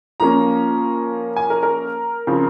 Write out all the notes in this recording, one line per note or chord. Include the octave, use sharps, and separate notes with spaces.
F3 A#3 C#4 A#5
G#5
A#4
A#4
C#3 F3 C4